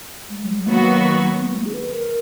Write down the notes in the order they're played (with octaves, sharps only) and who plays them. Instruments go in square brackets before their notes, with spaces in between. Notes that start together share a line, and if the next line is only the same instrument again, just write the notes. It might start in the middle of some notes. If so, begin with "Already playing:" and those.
[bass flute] G#3
F#3
G#3
[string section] D#3 F#3 B3 F#4 [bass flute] A#3
[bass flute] B3
G#3
A#3
G#4
B4
A#4